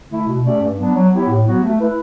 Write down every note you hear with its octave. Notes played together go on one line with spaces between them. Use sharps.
D3 A3 E4
B2
A3 C#4 G4 D5
G2
F#3 B3 D4
F#3
B3 E4 G4 C#5
A2
F#3 B3 F#4
A3
E4 B4